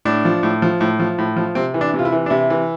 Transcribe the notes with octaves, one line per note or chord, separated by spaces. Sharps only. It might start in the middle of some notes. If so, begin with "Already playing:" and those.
A2 D4
F3
A2
F3
A2
F3
A2
F3
C3 C4
E3
D4
C3
F4
E4
E3
D4
C3 E4
E3